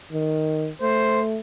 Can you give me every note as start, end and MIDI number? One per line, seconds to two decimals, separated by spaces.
0.13 0.69 51
0.82 1.40 57
0.82 1.21 72